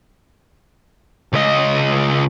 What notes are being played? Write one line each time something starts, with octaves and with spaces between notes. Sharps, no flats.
C#2 D#5